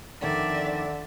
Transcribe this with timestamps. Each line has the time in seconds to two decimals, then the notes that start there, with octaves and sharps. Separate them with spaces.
0.22 F2 D3 D#3 D5 E5